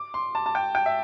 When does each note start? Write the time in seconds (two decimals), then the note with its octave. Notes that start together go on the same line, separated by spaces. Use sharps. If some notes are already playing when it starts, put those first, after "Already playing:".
Already playing: D6
0.14 C6
0.35 A5
0.46 A5
0.55 G5
0.75 G5
0.86 E5